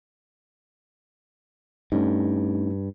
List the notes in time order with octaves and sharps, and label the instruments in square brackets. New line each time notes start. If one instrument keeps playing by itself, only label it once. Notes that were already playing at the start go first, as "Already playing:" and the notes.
[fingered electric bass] G2 [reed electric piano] A3 C#4 D#4